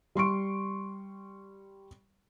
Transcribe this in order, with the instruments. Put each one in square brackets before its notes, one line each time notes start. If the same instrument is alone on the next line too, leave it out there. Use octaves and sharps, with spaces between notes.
[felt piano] G3 C6 C#6 D7